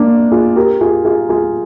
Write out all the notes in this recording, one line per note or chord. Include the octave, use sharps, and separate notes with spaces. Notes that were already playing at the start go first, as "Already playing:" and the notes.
Already playing: A#3 D4
F4 G#4
G4 A#4
F4 G#4
F4 G#4
F4 G#4